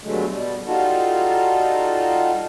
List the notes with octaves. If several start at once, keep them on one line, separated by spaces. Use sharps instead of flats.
G2 B2 D3 F#3 G#3 A3
B2 G3
G3 D#4 F4 F#4 A4